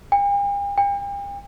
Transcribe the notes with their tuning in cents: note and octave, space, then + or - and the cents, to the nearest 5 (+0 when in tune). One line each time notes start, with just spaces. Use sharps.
G5 +45
G5 +40